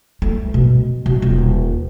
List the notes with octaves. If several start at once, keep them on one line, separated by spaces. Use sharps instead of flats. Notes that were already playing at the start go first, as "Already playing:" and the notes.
A3
B2
B2
D#1